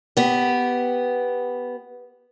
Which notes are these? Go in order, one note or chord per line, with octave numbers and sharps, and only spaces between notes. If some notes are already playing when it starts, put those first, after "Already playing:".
B3 G4